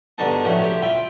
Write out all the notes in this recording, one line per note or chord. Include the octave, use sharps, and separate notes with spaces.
G2 B2 D3 G#3 D#4 A5
A2 C#3 F3 F#3 A3 C#4
G4 C5 E5
E4 F4 E5 G5 B5